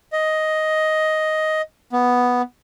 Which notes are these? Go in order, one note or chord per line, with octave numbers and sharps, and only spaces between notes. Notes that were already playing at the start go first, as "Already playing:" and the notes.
D#5
B3